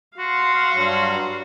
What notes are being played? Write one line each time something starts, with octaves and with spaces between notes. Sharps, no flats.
F#4 F5 C6
G2 F#3